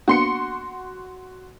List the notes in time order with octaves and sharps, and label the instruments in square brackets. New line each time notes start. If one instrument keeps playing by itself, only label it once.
[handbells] A#3 B3 D4 [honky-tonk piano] F#4 C6 C#7